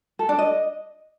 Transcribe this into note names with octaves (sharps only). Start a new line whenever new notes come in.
A4
D4
D#5